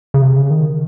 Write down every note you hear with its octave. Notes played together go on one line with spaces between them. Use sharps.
C#3
C3
C#3
D#3